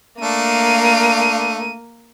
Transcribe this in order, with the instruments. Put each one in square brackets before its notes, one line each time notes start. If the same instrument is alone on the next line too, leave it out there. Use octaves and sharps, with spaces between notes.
[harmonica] A3 D4 F5 [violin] A#3 D#7